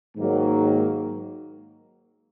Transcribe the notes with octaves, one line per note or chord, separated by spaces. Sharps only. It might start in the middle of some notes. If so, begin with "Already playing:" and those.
G#2 D#3 F#3 A#3